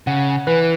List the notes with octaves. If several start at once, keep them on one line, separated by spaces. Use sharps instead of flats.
C#3 F#5
E3 B4